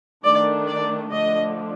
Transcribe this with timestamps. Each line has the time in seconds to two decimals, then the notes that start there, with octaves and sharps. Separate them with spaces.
0.24 D#3 A3 D4 D5
0.67 D5
1.10 D3 F3 A3 D4 D#5